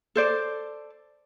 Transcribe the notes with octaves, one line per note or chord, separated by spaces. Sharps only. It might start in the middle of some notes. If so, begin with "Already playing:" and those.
A4 C5 D5